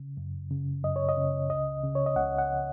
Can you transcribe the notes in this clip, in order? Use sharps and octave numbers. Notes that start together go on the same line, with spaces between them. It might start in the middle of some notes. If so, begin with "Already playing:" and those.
Already playing: C#3
F#2
C#3
F#2 D#5
C#5
D#5
C#3
C#2 D#5
C#3
C#5
D#5
C#2 F#5
F#5